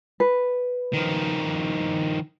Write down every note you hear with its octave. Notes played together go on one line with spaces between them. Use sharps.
B4
D#3 F3